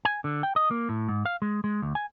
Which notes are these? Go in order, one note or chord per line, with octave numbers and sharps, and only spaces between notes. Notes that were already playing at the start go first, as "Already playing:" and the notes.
G#5
D3
G5
D#5
A#3
A2
G#2
F5
G#3
G#3
D2
G#5